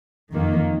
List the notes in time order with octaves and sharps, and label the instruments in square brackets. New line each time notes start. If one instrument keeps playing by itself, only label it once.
[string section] F2 D#3 A#3